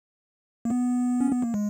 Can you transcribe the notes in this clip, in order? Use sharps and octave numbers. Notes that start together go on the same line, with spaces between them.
A#3
B3
C#4
B3
A#3
G#3